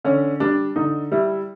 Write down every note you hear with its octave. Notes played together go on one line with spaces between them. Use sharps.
D3 C#4
G3 D4
D3 D#4
G3 E4